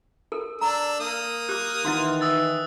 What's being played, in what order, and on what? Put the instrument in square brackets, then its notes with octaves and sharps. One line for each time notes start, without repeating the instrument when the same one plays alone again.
[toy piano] A4 A#4
[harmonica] D4 E6 [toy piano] A#5
[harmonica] A#3 D#6
[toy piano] G4 D6 [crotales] F#6
[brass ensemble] D#3 E3 [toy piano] E4 F#5 C6
[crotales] D#6 E6 A6